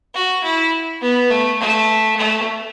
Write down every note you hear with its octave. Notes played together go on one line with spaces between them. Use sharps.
F#4
E4
B3
A3
A3
A3